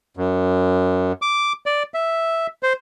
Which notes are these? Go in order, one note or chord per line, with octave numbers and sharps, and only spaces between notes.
F#2
D6
D5
E5
C5